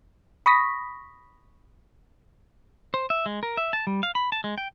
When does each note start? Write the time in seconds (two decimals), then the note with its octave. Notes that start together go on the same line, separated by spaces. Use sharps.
0.46 B5 C#6 D#6 A#6 B6
2.94 C5
3.10 E5
3.26 G#3
3.43 A#4
3.57 E5
3.73 A5
3.87 G3
4.03 F5
4.15 B5
4.32 A5
4.44 G#3
4.58 G5